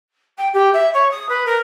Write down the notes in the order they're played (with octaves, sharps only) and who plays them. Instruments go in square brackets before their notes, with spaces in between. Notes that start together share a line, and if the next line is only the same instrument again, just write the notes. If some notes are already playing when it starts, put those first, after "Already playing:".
[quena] G5
G4
E5
C#5
D#6
B4
A#4